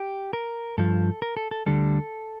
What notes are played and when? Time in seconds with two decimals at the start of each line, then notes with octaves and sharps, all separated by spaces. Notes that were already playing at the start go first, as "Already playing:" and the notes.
Already playing: G4
0.33 A#4
0.78 G2 F3 A4
1.22 A#4
1.37 A4
1.51 A4
1.66 D2 D3 G3 A4